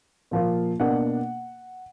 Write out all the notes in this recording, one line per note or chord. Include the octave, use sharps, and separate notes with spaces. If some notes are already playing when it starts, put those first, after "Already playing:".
A#2 F3 A#3 F4
B2 A#3 D4 F#5